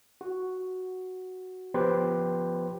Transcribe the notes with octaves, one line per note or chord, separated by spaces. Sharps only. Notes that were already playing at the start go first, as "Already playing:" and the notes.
F#4
F3 B3 G4 B4 C5